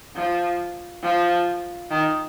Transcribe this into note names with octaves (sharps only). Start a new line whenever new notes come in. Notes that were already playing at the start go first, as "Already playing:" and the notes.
F3
F3
D#3